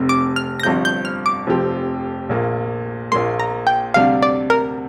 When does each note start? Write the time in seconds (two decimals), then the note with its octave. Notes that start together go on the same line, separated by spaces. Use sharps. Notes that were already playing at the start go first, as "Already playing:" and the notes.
Already playing: F1 F2 C3
0.09 D6
0.36 F6
0.60 A#6
0.63 G1 G2 F3 C4 G6
0.85 G6
1.05 F6
1.26 D6
1.47 F1 F2 F3 C4 G4
2.29 A#1 A#2 A#3
3.12 A#1 A#2 A#3 C6
3.40 A#5
3.67 G5
3.94 D2 C3 G3 D4 F5
4.22 D5
4.50 A#4